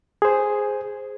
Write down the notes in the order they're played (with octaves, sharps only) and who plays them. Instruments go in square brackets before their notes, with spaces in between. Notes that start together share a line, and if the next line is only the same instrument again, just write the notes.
[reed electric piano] G#4 C5